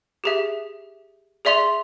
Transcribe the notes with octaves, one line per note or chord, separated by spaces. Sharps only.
G4 G#4 E5
G#4 D5 E5 C6 F7